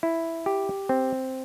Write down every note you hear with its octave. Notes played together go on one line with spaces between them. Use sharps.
E4
G4
C4